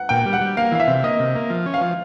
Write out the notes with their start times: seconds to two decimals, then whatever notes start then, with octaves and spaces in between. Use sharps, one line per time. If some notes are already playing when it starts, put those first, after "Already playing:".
Already playing: F#5
0.09 A#2 G5
0.26 G3
0.33 F#5
0.41 G3
0.57 A#3 F5
0.72 E3 F5
0.80 E5
0.87 C3
1.03 A#3 D#5
1.20 C3
1.35 A#3
1.50 F3
1.66 C#4
1.74 F5
1.81 F3